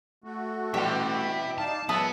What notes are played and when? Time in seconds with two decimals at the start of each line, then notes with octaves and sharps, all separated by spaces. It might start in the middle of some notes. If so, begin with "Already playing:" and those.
0.24 A3 F#4
0.74 B2 E3 G3 G4 E5 C6
1.58 D#4 D5 F5 A5
1.89 A#2 F#3 G#3 B3 E5 A5 D#6